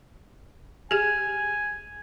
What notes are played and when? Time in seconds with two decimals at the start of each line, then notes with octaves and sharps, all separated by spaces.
0.91 G4 G#4 G#5